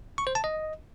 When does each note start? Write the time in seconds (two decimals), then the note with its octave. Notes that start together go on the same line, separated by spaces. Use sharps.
0.18 C#6
0.27 C5
0.35 A5
0.44 D#5